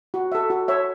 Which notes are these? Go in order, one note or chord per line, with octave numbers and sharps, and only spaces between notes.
F#4
A4 E5
F#4
C#5 E5